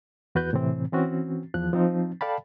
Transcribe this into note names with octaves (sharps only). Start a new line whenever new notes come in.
E2 F#4 B4 F#6 G6
A2 C3 E3 C4
E3 C4 C#4 F#4
E2 F3 F#6
F3 C4 D#4
A4 D5 F5 G5 A5 B5